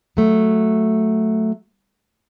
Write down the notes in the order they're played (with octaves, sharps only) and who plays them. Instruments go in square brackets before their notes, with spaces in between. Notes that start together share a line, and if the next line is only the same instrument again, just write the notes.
[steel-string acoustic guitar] F#3 A3